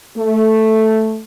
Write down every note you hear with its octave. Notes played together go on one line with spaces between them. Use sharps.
A3